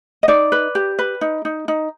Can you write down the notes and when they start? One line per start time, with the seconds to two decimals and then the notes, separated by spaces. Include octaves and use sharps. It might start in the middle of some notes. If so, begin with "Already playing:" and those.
0.23 D#5
0.28 D#4 D5
0.52 B4
0.75 G4
0.99 B4
1.21 D#4
1.45 D#4
1.68 D#4